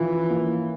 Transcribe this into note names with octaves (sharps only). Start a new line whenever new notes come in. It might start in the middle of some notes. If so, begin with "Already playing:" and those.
Already playing: E3 F3 C#4 F4
A#3